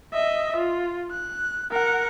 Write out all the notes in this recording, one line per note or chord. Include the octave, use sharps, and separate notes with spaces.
D#5 E5
F4
F#6
A#4 F#5